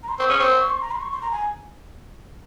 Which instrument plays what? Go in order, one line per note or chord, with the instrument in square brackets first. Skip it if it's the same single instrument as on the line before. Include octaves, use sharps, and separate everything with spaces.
[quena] A#5
C6
[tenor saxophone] C4 [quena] C#6
[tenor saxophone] C#4 [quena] D#6
[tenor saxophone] C4 [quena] C6
[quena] C#6
C6
A#5
C6
C#6
C6
A#5
G#5